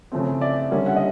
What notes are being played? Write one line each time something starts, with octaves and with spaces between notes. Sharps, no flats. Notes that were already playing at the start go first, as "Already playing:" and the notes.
C#3 F3 A3 C4
D5 E5
D3 G3 A#3 C#4
E5 F#5
D#5